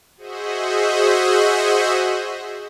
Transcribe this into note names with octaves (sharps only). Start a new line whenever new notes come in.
F#4 G#4 C5 D#5 E5 F#5